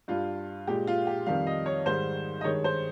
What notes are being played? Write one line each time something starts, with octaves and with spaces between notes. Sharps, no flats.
G2 G3 F4
A#2 G#3 G4
F4
G4
F2 D#3 G3 F5
D#5
C#5
G#2 D#3 G3 C5
D#5
G2 D#3 G#3 C#5
C5